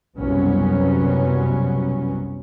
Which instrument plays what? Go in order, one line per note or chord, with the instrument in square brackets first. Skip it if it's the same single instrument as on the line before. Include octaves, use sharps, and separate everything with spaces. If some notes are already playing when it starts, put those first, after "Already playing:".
[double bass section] C2 F#2 B2 F#3 B3 C#4